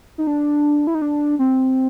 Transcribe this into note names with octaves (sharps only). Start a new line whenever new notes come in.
D#4
D4
E4
D#4
D4
C4